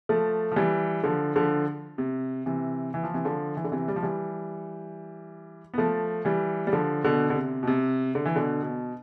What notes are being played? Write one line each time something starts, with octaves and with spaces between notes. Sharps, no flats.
F3 A3
F3
E3 G3
D3 F3
D3 F3
C3
C3 E3
E3
F3
C3 E3
D3 F3
E3
D3
C3 E3
G3
F3
E3 G3
B3
F3 A3
E3 G3
G3
D3 F3
B2 D3
D3
C3
B2
C3
D3
E3
B2 D3
B2